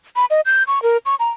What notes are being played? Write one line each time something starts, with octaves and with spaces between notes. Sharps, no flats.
B5
D#5
G6
C#6
A#4
C#6
A#5